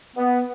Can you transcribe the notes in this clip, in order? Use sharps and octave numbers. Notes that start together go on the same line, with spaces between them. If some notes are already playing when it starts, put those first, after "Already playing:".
B3